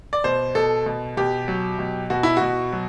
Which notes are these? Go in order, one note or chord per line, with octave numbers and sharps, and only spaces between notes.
D5
B2 C5
B2 A4
B2
B2 G4
F#3
B2
B2 F#4
E4
B2 F#4
F#3